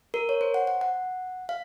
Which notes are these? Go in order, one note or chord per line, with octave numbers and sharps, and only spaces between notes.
A#4
C#5
C5
F#5
F#5
F#5
F5